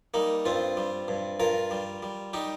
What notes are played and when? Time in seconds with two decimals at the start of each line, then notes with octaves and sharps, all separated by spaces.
0.14 G3 A#3 D#4
0.45 G2 C4 F4
0.77 G3
1.08 G2
1.40 G2 F4 A#4
1.71 G3
2.03 G3
2.33 G3 D#4 G4